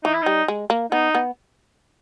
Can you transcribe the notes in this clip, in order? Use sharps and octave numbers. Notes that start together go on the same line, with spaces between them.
E3 D#4
E4
G3 D#4
G#3
A#3
B3 D#4
B3